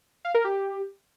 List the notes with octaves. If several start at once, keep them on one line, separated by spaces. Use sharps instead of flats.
F5
A#4
G4